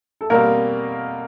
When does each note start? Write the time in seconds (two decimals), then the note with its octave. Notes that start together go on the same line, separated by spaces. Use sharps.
0.21 A4
0.30 B2 G3 A#3 C4 A#4